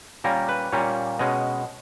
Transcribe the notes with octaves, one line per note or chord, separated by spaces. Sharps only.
A#2 G3 A#3 C#4 A#4
B4
A#2 G3 A#3 C#4 C#5
B2 G#3 C#4 D#5